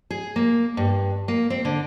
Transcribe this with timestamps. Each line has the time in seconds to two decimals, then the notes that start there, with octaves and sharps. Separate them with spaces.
0.10 G#4
0.36 A#3
0.77 G2
1.28 A#3
1.50 C4
1.65 D3